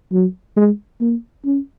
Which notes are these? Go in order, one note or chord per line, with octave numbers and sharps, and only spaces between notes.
F#3
G#3
A#3
C#4